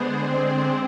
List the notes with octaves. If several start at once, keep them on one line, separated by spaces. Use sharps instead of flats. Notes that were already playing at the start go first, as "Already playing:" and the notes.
Already playing: D3 G#3 B3 D4 G#4 C5
C4